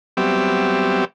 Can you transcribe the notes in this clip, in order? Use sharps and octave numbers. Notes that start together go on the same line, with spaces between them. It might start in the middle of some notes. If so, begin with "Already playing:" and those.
F#3 G3 B3 C4 G4 E5